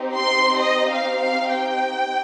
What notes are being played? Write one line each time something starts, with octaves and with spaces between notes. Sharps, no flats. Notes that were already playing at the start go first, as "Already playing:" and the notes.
Already playing: C4 D#4 G4
C6
D#5
F5
F5
G5